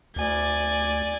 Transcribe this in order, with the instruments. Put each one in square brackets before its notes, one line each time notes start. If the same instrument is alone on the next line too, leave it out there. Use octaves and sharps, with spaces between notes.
[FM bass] D2 [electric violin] D5 G#5